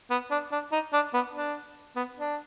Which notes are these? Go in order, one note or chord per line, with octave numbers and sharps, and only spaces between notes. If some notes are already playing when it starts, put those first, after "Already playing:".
B3
D4
D4
D#4
D4
B3
D4
B3
D4